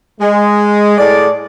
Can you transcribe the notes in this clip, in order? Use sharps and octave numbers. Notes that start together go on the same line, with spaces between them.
G#3
A2 G#4 D5